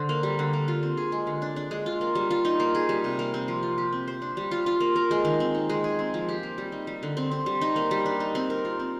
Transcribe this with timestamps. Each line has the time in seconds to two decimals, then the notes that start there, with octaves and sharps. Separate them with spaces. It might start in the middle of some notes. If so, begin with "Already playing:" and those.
Already playing: D3 C5
0.09 A#3
0.23 G3
0.39 D3
0.53 A#3
0.68 F4
0.83 C4
0.97 G#4
1.12 G#3
1.27 D3
1.42 D4
1.56 D4
1.71 G#3
1.86 F4
2.01 A#3
2.15 G3
2.31 F4
2.45 D#4
2.60 A#3
2.75 G#4
2.89 G3
3.04 C3
3.19 A#3
3.34 C4
3.48 F3
3.63 F4
3.78 G4
3.92 C4
4.08 C5
4.22 D4
4.37 G3
4.51 F4
4.66 F4
4.80 A#3
4.96 A#4
5.11 G#3
5.25 D#3
5.40 C4
5.55 D#4
5.70 G#3
5.84 G#4
5.99 C4
6.14 F3
6.29 G4
6.43 A#3
6.58 G3
6.72 D#4
6.87 G3
7.03 D3
7.17 C4
7.31 C4
7.46 G3
7.61 D#4
7.76 A#3
7.91 G3
8.06 D4
8.20 D#4
8.35 C4
8.50 A#4
8.65 F4
8.79 C4